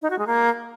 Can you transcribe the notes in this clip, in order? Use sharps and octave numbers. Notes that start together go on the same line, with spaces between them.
D#4
F#4
G#3
A#3